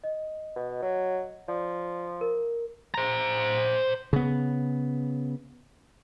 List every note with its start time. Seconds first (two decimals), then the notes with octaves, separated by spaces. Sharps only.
0.04 D#5
0.56 B2
0.82 F#3
1.48 F3 D5
2.21 A#4
2.94 C5 A#5
4.13 C#3 B3